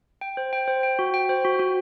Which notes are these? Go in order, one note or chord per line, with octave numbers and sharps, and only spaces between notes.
G5
C5
G5
C5
G5
F#4
G5
C5
F#4
F#4